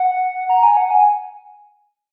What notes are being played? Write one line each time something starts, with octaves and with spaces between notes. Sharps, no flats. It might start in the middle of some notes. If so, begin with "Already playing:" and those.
Already playing: F#5
A#5
G#5
F#5
G#5